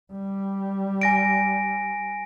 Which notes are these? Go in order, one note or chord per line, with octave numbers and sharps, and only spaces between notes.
G3
G#5 A#6 D7